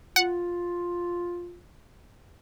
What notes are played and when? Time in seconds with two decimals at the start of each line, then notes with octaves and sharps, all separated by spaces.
0.16 F4 F#5